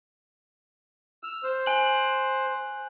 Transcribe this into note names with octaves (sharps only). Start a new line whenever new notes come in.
E6 F6
C5
G#5 F#6 F#7